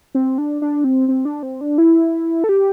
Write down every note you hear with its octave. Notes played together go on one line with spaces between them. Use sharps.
C4
D4
D4
C4
C4
D4
C4
D4
E4
A4
G4